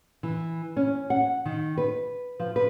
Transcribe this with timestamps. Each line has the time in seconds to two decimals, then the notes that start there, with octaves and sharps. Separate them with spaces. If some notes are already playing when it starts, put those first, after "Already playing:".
0.23 E3
0.77 C#4
1.10 F#5
1.46 D#3
1.78 B4
2.40 F3
2.56 B4